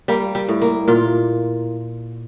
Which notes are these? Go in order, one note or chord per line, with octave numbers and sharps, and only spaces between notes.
G3 A#3
G3
A2
A#3
A#2 F4